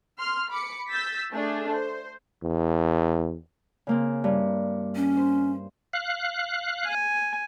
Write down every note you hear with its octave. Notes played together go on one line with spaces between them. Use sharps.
C6 F6
B5 D6 C#7
E6 G6 A6 B6
A3 D4 G#4
C5
E2
C#3 A#3 C4
G2
C#4
C5
F5 F#6
G#5